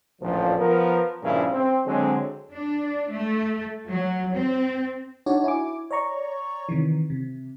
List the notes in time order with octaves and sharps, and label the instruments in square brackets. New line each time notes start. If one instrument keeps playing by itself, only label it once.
[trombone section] A1 D2 A#2 F3
F3 B3 A#4
G2 A#2 C#3 F3 E4
C4
D3 F#3 G#3 C4
[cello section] D4
A3
F#3
C4
[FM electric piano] D4 D#4 F#4 C#5 D5
E4 G#5 D6
C#5 D5 A#5 C#6
C3 D#3 E3
C3